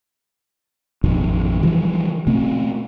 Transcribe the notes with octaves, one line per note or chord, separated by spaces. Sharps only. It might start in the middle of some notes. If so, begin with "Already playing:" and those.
A1 F2 B2 D#3
D3 E3 F3 G3
B2 A3 C4